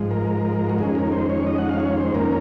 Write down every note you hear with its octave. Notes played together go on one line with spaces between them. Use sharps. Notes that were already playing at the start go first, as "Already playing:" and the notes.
Already playing: G#2 F3 G#3
A#4
F#4
F2 D#3 G#3 C#4 G#4
A#4
C5
C#5
D#5
F#5
F5
C#5
C5
F2 D#3 A#3 C#4 A#4